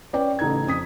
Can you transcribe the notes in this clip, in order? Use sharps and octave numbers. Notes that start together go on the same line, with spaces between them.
C#4 B4 C#5 D5 G5
A1 C#3 D#4 A4 G#6
F2 D#6 B6